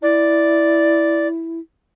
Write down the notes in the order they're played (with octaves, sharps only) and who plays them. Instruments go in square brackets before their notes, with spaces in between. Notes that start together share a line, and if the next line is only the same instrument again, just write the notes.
[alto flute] E4 [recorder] D5